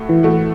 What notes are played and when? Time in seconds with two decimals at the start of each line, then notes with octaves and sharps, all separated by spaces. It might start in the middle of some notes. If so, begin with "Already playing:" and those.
Already playing: A2 A3 F#4
0.09 E3
0.23 A2 A3 F#4